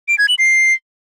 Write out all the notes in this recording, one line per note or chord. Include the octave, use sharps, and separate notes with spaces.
D7
G#6
F#7
C7